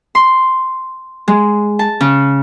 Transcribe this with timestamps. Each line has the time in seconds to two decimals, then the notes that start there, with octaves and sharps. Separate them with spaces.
0.15 C6
1.28 G#3
1.79 A5
2.00 C#3